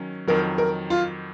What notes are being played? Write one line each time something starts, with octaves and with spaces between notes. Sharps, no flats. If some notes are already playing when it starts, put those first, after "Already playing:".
Already playing: D#3 F#3 C#4
F2 D#3 F#3 A#4
A#4
F4